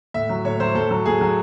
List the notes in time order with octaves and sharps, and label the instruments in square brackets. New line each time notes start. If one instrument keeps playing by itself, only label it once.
[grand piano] A2 E5
F#3
A2 C#5
F#3 C5
A2 A4
F#3
A2 G#4
F#3